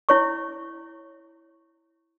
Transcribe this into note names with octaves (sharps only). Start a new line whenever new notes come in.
E4 C#5 C#6